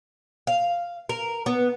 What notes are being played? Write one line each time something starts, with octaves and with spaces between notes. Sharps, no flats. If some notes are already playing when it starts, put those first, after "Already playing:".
F5
A#4
B3